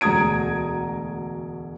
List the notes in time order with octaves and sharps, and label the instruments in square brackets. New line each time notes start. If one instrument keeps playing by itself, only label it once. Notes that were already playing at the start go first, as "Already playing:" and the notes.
[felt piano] E1 D2 A#5 D#6 G#6 D7